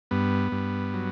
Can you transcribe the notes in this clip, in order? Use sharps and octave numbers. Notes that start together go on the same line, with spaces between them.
G2 B3
G2
F#3